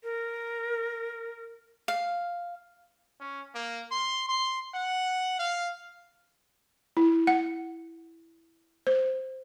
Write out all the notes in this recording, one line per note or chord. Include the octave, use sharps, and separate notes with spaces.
A#4
F5
C#4
A#3
C6
C6
F#5
F5
E4
F#5
C5